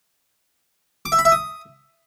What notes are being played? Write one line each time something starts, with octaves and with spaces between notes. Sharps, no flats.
D6
E5
B5
E5
D#6